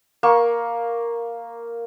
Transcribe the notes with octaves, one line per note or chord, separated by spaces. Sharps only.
A#3 C#6